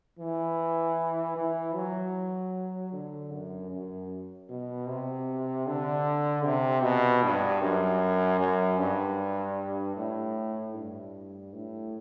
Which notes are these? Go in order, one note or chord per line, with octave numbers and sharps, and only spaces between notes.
E3
E3
F#3
D3
F#2
F#2
B2
C3
D3
C3
B2
G2
F#2
F#2
G2
A2
G2
A2